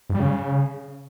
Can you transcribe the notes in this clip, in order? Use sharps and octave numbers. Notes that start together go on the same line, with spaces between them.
G2
G3
C#3